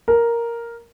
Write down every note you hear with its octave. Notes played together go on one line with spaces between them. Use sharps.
A#4